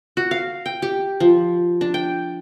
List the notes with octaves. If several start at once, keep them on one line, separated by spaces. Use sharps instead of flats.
F#4
F5
G5
G4
F3
D4
G5